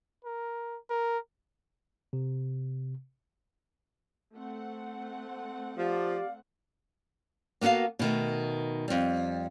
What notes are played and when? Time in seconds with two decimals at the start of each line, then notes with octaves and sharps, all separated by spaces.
0.25 A#4
0.90 A#4
2.13 C3
4.36 A3 C4 F#5
5.77 F3 G4 D5 F5
7.61 A#3 B3 F#4 A4 F5
7.99 B2 D#3 A3
8.88 F2 G3